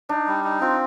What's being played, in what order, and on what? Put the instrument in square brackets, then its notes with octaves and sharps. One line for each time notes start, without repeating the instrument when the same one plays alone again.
[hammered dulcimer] D4 [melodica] D#4
[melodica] G3
D#4
[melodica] C4 [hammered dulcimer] F4